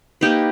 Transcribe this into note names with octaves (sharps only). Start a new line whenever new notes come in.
A#3 D#4 G4 B4